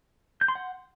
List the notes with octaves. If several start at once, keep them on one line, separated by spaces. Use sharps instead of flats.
G6
C6
F#5